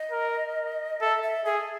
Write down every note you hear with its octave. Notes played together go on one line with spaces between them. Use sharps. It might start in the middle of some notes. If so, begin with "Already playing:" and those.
Already playing: D#5
A#4
A4 E5
E5
G#4 E5